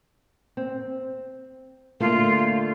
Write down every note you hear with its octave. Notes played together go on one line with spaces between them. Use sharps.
C4
D3 A3 A#3 F4